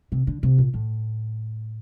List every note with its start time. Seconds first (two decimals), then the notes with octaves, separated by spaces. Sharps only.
0.12 C3
0.27 D3
0.43 C3
0.58 A#2
0.74 A2